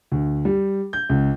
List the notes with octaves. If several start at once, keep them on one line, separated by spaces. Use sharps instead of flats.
D2
G3
G6
C#2